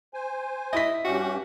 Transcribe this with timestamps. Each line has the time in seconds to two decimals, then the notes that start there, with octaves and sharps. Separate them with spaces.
0.14 C5 G#5
0.73 E4 D#5 B6
1.05 G2 C#4 F#4 G4